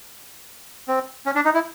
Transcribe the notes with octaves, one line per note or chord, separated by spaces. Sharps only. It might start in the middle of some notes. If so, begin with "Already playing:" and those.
C4
C#4
D4
D#4
E4